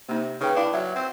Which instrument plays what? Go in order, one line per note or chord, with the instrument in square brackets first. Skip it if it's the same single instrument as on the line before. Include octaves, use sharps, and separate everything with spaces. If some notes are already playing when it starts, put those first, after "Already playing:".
[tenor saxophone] C3 [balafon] A#3 D#4
[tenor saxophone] C#3 [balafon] D#4 B4 G5
[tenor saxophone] D4 [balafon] E4 F5
[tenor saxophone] F#3 [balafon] E5
[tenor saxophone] C4